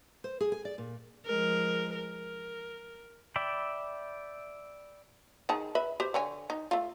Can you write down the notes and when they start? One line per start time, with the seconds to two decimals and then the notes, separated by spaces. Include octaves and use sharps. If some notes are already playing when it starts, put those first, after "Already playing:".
0.24 C5
0.41 G#4
0.52 G#5
0.65 D5
0.78 A#2
1.26 F3 G#3 A#4
1.95 A#4
3.36 D5 E5 G5 B5
5.49 D#3 G#4 A5
5.75 B4 E5 B5
6.00 G4 C5
6.14 D3 C#5 G#5
6.50 D#4
6.71 A3 F4